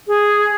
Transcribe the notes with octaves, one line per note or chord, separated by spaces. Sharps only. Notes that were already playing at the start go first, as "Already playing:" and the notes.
G#4